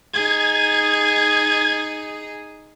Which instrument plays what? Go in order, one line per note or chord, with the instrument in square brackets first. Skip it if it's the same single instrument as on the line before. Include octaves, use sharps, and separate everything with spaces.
[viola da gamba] D#4 G#4 [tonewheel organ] G#6